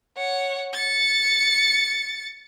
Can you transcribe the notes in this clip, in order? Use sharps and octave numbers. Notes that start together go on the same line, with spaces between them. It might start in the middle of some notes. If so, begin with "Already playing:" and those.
C#5 F#5
A6 C#7